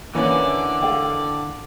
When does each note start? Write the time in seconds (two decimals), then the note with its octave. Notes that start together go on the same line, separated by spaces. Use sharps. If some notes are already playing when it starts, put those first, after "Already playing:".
0.15 D3 E3 A#3 C#4 D5
0.82 A4 F5 G5